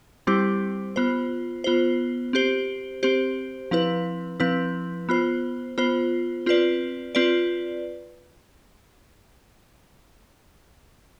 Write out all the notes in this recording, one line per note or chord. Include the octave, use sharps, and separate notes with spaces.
G3 C4 E4 G4 C5
B3 F4 C5
B3 F4 C5
C4 G4 C5
C4 G4 C5
F3 C4 E4 B4
F3 C4 E4 B4
B3 F4 C5
B3 F4 C5
C4 F4 B4 D5
C4 F4 B4 D5